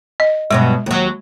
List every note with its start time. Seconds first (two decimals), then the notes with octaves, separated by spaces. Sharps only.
0.20 D#5
0.51 G2 B2 F#3 G#3
0.86 D#2 F#3